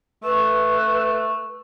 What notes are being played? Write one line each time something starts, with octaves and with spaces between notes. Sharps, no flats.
A3 B4